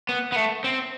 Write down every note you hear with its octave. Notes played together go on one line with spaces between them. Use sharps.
B3
B3
A3
C4